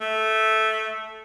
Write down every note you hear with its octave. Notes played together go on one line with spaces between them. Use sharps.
A3